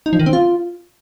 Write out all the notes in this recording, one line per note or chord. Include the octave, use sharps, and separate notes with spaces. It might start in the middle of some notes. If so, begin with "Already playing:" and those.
D#4
F3
D#3
C4
F4